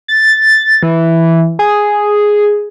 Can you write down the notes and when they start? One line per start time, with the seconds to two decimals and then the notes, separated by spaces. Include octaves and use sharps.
0.08 A6
0.83 E3
1.59 G#4